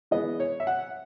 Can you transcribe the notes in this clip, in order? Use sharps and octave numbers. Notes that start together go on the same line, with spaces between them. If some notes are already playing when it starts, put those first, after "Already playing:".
E3 G#3 B3 D#5
C#5
E5
F#5